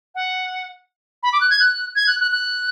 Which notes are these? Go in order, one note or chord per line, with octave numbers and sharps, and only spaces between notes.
F#5
B5
D6
F#6
G#6
F#6
G#6
F#6
F#6
F#6